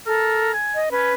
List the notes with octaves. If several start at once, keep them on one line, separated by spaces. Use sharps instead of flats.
A4 A#4
G#5
D#5
C#4 B4